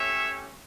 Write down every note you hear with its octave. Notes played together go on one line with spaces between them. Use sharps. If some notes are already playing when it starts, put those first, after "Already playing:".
Already playing: A3 C#4 G4 C#5 E5